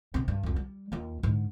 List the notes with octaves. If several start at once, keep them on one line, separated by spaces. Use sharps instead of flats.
C3 C4
G2
C2 F2
G3
D#2 F4
G#2 D3